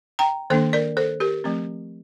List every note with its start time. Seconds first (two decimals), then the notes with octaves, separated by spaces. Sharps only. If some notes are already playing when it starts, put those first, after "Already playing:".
0.19 G5 A#5
0.50 D#3 A#3 D4 A4 C5
0.73 A#4 D5
0.97 A4 C5
1.20 G4 A#4
1.44 F3 A3 C4